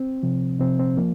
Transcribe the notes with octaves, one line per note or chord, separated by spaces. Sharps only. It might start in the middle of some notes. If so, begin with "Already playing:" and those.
Already playing: C4
C3 F3
C3 F3 C4
C4
F3 A#3